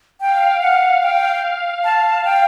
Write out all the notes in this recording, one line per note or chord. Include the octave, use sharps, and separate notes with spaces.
F5 G5
F#5
G5
A5
G5